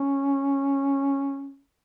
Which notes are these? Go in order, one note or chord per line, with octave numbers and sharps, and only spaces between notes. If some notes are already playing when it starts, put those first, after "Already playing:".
Already playing: C#4